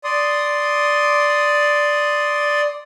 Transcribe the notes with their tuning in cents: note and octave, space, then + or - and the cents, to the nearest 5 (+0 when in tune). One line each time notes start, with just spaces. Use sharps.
D5 +0 C6 +0 D#6 +0